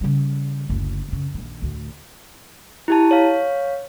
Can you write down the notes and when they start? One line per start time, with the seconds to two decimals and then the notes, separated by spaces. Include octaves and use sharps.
0.01 C#3 G3
0.69 F#1 D2
1.09 F#2 C#3
1.34 A#1 D#3
1.62 D2 A2
2.88 E4 G4 A5
3.11 C#5 F5